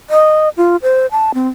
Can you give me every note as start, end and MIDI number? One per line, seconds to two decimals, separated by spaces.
0.10 0.49 75
0.57 0.76 65
0.83 1.06 72
1.12 1.32 81
1.34 1.48 60